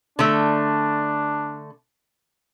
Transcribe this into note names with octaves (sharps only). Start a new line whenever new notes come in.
D3 A3 D4